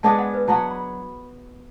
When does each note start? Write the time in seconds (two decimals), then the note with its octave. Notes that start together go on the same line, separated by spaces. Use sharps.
0.03 G#3 B3 D4 G#4 A5
0.19 F#5
0.34 B4
0.48 F#3 B3 F#4 A5
0.71 B5